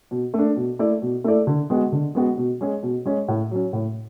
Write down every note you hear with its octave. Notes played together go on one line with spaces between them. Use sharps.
B2
A3 D4
B2
A3 E4 A4 D5
B2
A3 E4 A4 D5
D3
G#3 B3 F#4
D3
G#3 B3 F#4
B2
G#3 C#4 G#4
B2
G#3 C#4 G#4
A2
F#3 C#4
A2